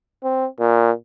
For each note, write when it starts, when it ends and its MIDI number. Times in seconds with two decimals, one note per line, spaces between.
0.23 0.46 60
0.60 0.91 46